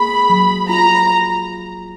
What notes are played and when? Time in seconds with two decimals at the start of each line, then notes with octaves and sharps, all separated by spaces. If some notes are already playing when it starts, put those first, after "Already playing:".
Already playing: A#3 G#4 B5
0.30 F#3
0.69 F4 A#5